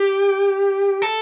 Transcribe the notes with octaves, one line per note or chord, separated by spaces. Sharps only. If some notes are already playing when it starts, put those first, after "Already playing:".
Already playing: G4
A4